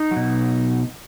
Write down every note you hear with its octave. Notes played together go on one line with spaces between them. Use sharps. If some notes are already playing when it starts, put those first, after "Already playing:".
Already playing: D#4
F#3
B2